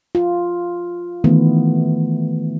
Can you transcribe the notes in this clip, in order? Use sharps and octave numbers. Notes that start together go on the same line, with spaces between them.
F4
D#3 E3 A3 B3